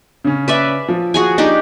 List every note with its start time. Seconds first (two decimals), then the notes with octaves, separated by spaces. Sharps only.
0.24 C#3 C#4
0.48 B4 D5 E5
0.88 F3
1.14 F#4 G#4 G#5
1.38 D4 D#4 G4